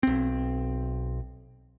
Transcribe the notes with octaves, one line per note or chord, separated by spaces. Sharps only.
B1 C4